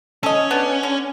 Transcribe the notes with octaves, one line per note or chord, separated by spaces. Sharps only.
C#4 A4 D#5
B3 D4
D3